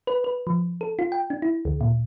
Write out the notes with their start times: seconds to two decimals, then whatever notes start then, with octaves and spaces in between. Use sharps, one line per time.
0.07 B4
0.24 B4
0.47 F3
0.81 A4
0.99 F4
1.12 G5
1.30 D4
1.42 E4
1.65 D2
1.81 A#2